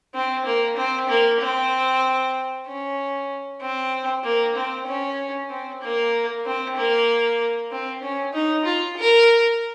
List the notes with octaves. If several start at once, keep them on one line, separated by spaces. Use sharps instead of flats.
C4
A#3
C4
A#3
C4
C#4
C4
A#3
C4
C#4
C4
A#3
C4
A#3
C4
C#4
D#4
F4
A#4